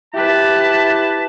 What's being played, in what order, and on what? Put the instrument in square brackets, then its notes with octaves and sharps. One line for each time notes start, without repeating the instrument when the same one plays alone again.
[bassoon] E4 [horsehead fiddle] G4 B4 [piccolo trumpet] A5